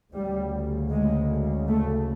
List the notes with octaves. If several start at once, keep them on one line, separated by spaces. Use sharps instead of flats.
D2 C#3 G3
G#3
A3